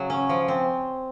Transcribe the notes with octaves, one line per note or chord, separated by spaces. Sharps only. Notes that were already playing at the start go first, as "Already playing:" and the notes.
Already playing: C#3 F#3 G#4
C#4
F3
C4